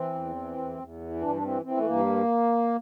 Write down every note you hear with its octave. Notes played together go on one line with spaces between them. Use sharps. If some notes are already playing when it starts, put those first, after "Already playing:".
Already playing: E3 C4
E2
E3
E2
E2
E3
G2 D4
D4
E3 C4
E3 C4
A3
G2 A#3